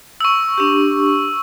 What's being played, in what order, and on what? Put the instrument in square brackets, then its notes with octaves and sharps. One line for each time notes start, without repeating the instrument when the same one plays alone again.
[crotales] C#6 E6
[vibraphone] D4 G4